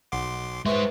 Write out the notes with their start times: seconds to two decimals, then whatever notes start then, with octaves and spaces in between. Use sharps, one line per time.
0.12 B1 F#5 C6 D6
0.66 G#3 B4 C5 E5 C6 C#6